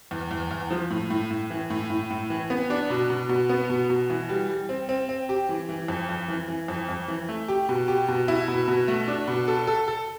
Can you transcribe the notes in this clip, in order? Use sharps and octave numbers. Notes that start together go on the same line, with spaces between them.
E2
E2
E2
F3
A2
A2
A2
E3
A2
A2
A2
E3
B3
D4
B2
B2
B2
B3
B2
B2
E3
G3
G3
C4
C4
C4
G4
E3
E3
F2
F2
E3
E3
F2
F2
E3
A3
G4
B2
G4
B2
E4
B2
B2
A3
D4
B2
A4
A4
A4